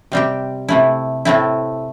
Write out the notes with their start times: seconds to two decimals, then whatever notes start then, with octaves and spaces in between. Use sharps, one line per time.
0.12 C3 G3 C4 G4
0.68 C3 A3 E4
1.25 A2 A3 C4 E4